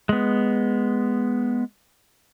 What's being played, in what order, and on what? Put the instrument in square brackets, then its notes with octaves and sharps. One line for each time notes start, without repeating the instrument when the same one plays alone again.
[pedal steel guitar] G#3 B3